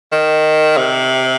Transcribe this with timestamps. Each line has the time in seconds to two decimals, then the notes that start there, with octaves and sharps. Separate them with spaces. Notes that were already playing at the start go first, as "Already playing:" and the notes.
0.12 D#3
0.77 C3